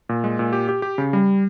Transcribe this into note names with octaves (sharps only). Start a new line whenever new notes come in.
A#2
G#3
A#2
G4
G4
G4
C#3
G3